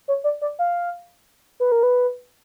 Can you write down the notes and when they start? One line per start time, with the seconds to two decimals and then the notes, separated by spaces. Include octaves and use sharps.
0.08 C#5
0.24 D5
0.42 D5
0.59 F5
1.60 B4
1.72 A#4
1.83 B4